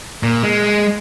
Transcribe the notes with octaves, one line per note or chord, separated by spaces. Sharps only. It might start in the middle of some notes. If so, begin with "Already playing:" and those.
A#2
G#3